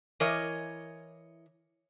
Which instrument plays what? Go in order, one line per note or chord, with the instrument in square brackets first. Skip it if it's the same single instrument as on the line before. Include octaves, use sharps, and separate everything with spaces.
[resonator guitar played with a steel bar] E3 A#4 C#5 D#5